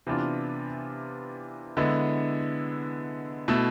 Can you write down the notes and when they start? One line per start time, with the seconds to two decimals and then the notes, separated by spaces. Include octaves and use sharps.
0.07 C3 E3 B3 D4 F4
1.77 D3 G#3 B3 E4
3.48 B2 A3 E4